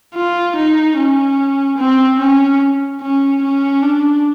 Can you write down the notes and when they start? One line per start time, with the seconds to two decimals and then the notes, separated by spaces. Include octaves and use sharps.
0.15 F4
0.56 D#4
0.97 C#4
1.78 C4
2.20 C#4
3.01 C#4
3.43 C#4
3.82 D4